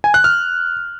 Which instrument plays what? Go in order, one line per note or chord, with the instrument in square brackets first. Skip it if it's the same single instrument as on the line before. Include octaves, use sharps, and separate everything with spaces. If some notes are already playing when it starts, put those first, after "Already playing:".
[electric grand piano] G#5
F#6
F6